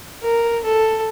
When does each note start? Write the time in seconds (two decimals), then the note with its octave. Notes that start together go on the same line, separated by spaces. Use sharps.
0.23 A#4
0.64 A4